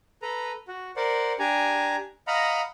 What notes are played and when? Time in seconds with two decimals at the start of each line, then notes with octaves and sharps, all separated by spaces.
0.22 A4 B4 A#5
0.68 F#4
0.96 A#4 C5 D5 F#5
1.39 D4 G4 G#5 A#5
2.27 D#5 F5 F#5 A#5 B5